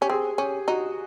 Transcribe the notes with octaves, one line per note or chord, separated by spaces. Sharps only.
C#4 G4
C4 G#4
C#4 G4
D#4 F#4